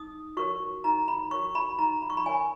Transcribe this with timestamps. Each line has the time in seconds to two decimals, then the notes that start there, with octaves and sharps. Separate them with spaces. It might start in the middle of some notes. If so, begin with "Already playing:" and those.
Already playing: D#4 D#6
0.37 F#4 A#4 C#5 C#6
0.84 D#4 A#5
1.08 B5
1.31 F#4 A#4 C#5 C#6
1.55 B5
1.79 D#4 A#5
2.02 B5
2.10 C#6
2.17 B5
2.26 A#4 C#5 G#5